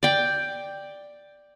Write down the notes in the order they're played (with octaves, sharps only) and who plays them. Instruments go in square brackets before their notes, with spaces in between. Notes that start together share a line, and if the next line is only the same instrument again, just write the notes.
[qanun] D5 G5